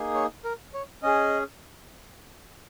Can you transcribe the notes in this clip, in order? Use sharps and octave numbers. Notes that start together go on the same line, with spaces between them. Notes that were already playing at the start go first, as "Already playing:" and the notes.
Already playing: A#3 D#4 G#4
C#5
A#4
C#5
C#4 G#4 D#5